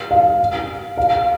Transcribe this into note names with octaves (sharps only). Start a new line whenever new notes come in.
F5
F5